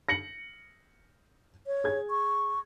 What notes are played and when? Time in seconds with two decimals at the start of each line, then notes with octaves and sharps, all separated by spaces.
0.09 A#6 C#7 F#7
1.67 C#5
1.84 G#4 G#6
2.10 C#6